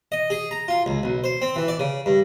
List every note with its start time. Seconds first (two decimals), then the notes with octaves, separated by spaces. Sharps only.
0.12 D#5
0.30 G#4
0.51 A#5
0.68 F4
0.86 C#2
1.03 B1
1.24 C5
1.42 C4
1.56 E3
1.68 D5
1.79 C#3
2.06 G2